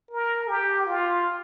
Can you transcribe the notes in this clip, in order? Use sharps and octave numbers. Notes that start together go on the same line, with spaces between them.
A#4
G4
F4